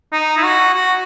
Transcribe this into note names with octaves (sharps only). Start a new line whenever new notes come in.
D#4
E4
F#4
F#4